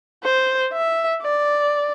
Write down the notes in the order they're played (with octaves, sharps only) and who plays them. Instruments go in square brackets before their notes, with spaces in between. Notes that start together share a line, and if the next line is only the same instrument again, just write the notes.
[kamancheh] C5
E5
D5